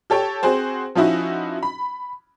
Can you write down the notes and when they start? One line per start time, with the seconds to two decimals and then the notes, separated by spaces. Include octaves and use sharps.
0.10 G4 A4 C#5 G5
0.43 C4 F#4 G#4 C5
0.95 F3 C#4 D#4 E4 F#4
1.63 B5